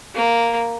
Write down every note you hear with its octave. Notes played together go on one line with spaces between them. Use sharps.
A#3